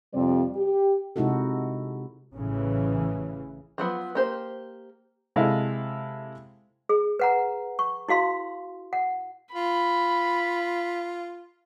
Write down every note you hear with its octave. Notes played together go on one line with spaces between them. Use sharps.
F2 C3 G3 C4 C5 D5
G4
C3 G#3 D#4 E4 F#4 A4
A1 C#3 E3
F3 F#3 B3
A#3 G4 C5
C3 G#3 E4 A4 F5
G#4
B4 F#5 A#5
C#6
E4 F#4 F5 C6
F#5
F4 B5